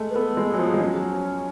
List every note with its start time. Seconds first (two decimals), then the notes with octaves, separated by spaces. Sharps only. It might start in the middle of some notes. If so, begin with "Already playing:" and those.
Already playing: G#3 A3
0.10 B4
0.15 B3 A4
0.37 G#3
0.48 G#4
0.54 F#3
0.59 F3
0.74 G#3
0.80 F#3 C#4